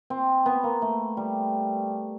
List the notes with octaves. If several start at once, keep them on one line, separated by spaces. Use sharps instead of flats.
C4
B3
A#3
A3
G3